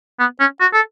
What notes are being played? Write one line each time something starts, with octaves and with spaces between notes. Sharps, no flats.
B3
C#4
F#4
A4